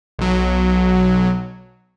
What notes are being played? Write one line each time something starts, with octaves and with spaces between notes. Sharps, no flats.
B1 F#3